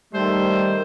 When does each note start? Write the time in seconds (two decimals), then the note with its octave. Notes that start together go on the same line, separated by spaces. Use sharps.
0.14 D#3 G3 A3 C5